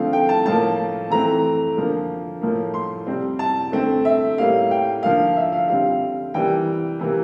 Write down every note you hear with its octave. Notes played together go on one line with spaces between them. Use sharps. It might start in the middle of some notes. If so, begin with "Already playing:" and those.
Already playing: D3 F3 A3 C4 F5
G5
A5
A2 F3 A#3 A5
E3 A3 C4 A#5
D3 F3 A#3
A2 F3 A#3
C6
C3 G3 C4
A5
D3 A3 C4
E5
A2 G3 A#3 F5
G5
D3 F3 A#3 F5
E5
F5
D3 G3 C4 F5
C3 E3 G3 A#3 G5
C3 E3 A#3